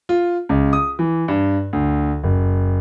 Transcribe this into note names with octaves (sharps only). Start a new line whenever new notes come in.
F4
C#2
D#6
E3
G2
D2
F#1